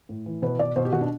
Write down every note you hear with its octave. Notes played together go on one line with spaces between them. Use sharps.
A2
E3
B2 B4
B2 D5
B2 C5
G4
B2 F#4
D4